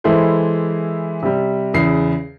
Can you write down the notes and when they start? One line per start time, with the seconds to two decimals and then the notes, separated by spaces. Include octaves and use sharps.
0.04 E3 G#3 E4 G#4 A4 C5
1.23 C3 G3
1.74 E2 C#3 G#4 C7